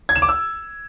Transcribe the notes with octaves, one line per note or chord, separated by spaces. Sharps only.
G#6
E7
D6
E6